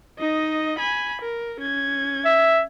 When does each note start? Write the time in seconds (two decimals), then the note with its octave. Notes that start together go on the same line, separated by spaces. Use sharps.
0.19 D#4 D#5
0.79 G#5 B5
1.22 A#4
1.61 C#4 G#6
2.25 E5